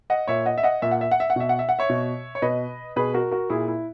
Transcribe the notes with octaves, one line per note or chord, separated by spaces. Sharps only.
D#5 F#5
A#2 C#5 E5
D#5 F#5
E5
D#5 F#5
A#2 E5
F#5
E5
F#5
E5
F#5
B2 E5
F#5
E5
F#5
C#5 E5
B2
C#5
B2 B4 D#5
B2 G#4 B4
F#4 A#4
F#4 A#4
A#2 E4 G#4
E4